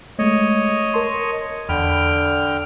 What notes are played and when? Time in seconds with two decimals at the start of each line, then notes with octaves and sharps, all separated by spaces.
0.19 G#3 A3 C#5 D#5
0.94 A#4 A5 C6
1.69 E2 D3 G5 B5 F6